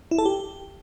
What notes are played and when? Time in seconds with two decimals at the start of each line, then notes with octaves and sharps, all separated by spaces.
0.11 E4
0.18 A4
0.25 G4